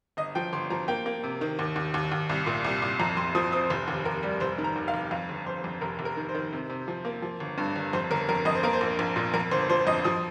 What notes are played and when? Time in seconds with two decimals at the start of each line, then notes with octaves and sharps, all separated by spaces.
0.17 G1 D#5
0.35 F3 G5
0.53 G1 C6
0.70 F3 A#5
0.88 A#3 G5
1.06 A#3
1.23 C3
1.41 D#3
1.59 D#2
1.76 D#2
1.94 D#2
2.12 D#2
2.29 C2
2.46 A#2
2.64 C2
2.82 C2
2.99 F2 A#5
3.17 F2 C6
3.35 F3 D#6
3.52 C4 D#6
3.70 F1 C5
3.88 D#2
4.05 D#2 A#4
4.23 G3
4.40 F1 C5
4.58 D#3
4.64 A#5
4.76 D#2
4.88 F5
4.94 F1
5.11 F2 F5
5.29 G1
5.46 F2 C5
5.64 F2
5.81 F1 A#4
5.99 F1
6.05 A#4
6.17 D#3
6.29 C5
6.34 D#3
6.53 C3
6.69 C3
6.88 F3
7.05 A#3
7.22 F3
7.40 G1
7.58 G2
7.76 G1
7.93 F2 C5
8.11 G1 A#4
8.29 F2 A#4
8.45 F2 D#5
8.55 C5
8.63 A#3 A#4
8.73 C5
8.81 A#1
8.99 A#1
9.16 A#2
9.34 F2 A#4
9.51 G1 C5
9.69 F3 C5
9.87 F2 D#5
10.05 F3 D#6